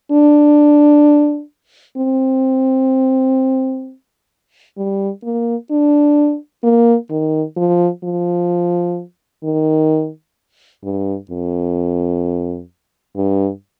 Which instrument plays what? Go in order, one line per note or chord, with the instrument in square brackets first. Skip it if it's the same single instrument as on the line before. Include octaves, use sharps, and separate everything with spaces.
[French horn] D4
C4
G3
A#3
D4
A#3
D#3
F3
F3
D#3
G2
F2
G2